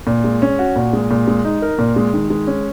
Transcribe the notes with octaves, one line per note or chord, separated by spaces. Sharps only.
A#2
G#3
C#4
F#4
A#2
G#3
A#2
G#3
D#4
A#4
A#2
G#3
D#3
G#3
C#4